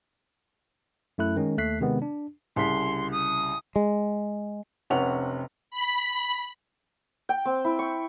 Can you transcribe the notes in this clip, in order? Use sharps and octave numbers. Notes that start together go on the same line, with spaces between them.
F#2 A3 E4 F#6
D#3 G#3 C#4
D#2 A3 F#6 B6 C7
C3 D#3 G#3 B3 C4
D4
C2 C#3 C6 B6
D#6
G#3
F1 C3 C#4 F#5 F7
B5
G5
C4
E4
C#6